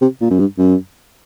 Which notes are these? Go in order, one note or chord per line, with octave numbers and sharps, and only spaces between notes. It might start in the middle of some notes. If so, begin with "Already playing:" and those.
C3
A#2
F#2
G2
F#2